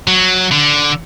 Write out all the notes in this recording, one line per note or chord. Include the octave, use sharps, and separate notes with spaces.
F#3
D3